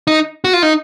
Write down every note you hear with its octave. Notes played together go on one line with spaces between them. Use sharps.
D#4
F#4
F4
D#4